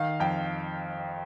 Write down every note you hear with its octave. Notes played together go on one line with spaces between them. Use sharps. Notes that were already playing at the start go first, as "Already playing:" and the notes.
Already playing: D#3 F5
F2 G5